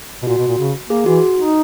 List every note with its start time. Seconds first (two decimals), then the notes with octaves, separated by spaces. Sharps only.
0.22 B2
0.27 A#2 F#4
0.38 B2
0.48 A#2
0.58 C#3
0.89 A#3 G#4
1.06 E3 F#4
1.37 D#4